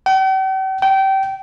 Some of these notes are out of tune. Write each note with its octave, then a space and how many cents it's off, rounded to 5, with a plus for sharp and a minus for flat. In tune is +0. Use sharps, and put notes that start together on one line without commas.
G5 -45
G5 -25